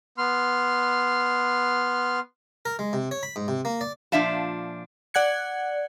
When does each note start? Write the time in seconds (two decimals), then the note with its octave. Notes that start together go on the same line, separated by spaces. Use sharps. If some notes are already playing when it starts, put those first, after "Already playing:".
0.18 B3 C6 F6
2.65 A#4
2.79 G#3
2.93 C3
3.11 C#5
3.23 B5
3.36 G#2
3.48 C3
3.65 A#3
3.81 D5
4.12 A#2 F3 D4 E5 F5 A5
5.14 D5 F#5 F#6 G#6 C#7